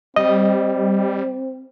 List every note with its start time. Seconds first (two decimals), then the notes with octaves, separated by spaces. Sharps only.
0.16 G3 C4 D#5